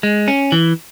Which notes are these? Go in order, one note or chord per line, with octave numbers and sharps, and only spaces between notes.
G#3
C#4
E3